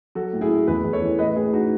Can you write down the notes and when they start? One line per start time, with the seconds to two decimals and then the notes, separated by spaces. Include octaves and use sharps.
0.15 F#3 F#4 A4
0.33 A2
0.41 E4 G#4
0.50 A2
0.67 E2 G#4 B4
0.84 E2
0.93 A4 C#5
1.02 E3
1.19 A2 B4 D#5
1.36 A2 G#4 B4
1.53 A2 D#4 F#4